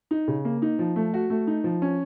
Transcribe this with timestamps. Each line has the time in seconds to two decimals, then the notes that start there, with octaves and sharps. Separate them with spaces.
0.11 D#4
0.28 C#3
0.45 A#3
0.62 D#4
0.79 F3
0.96 A3
1.14 F#4
1.30 A3
1.47 D#4
1.64 F3
1.82 C#4